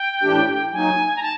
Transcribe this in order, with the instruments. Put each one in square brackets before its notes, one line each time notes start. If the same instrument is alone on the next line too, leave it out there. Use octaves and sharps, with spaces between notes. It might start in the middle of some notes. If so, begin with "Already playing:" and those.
Already playing: [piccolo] G5
[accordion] A2 E3 A3 D4 G4
[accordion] F#3 A#3 D#4 [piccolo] G#5
[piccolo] A#5
A5